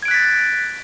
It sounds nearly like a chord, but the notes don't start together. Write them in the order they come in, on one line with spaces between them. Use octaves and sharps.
G#6 D7 F#6 B6 A6